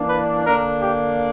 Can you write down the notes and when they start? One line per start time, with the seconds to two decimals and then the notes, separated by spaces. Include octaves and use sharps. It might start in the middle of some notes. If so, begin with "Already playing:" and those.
Already playing: E3 A#3 D4
0.09 B4
0.45 D3 A#3 D4 A#4
0.82 G4